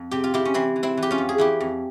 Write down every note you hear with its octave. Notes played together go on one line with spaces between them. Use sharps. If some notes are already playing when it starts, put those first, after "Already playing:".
Already playing: F2
C3 G4
F4
C3 E4 G4
C#4
E3 C4 E4
E3
C4 E4
E3
G4
C#4 F4
F2
G#4
E3 E4 G4
F2